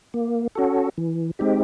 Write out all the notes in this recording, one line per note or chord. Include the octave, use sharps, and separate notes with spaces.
A#3
C#4 F#4 A4
E3
G#3 C4 D#4 G4